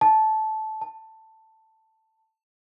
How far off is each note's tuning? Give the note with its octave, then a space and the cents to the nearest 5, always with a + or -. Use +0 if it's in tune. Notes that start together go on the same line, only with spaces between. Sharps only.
A5 -15
A5 +10